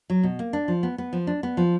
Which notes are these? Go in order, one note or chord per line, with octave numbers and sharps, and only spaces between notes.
F#3
B2
A#3
D4
F3
B3
B3
F3
D4
B3
F3